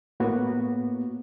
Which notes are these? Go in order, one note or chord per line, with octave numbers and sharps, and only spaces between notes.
A2 A#3 B3 F#4